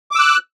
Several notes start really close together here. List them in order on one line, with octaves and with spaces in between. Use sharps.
D6 E6 F#6